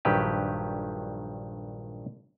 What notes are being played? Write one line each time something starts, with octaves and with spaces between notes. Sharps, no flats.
A#1 G2 D#3 F#3 G4 B4